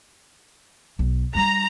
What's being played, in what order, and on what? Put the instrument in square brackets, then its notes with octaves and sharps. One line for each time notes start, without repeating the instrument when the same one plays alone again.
[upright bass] B1
[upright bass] G3 D#4 [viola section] A#5